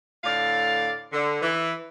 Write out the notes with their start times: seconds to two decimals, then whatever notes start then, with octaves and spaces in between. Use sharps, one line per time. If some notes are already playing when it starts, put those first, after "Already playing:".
0.24 A2 D3 D5 F5
1.13 D3
1.42 E3